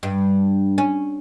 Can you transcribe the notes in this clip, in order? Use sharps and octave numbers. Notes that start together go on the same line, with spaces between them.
G2
C#4